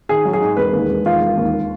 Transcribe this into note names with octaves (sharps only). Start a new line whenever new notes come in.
D#3 G#4
F#3
G#4
G#2
E1 B4
D#2
E1
D#3 F4
E1
D#2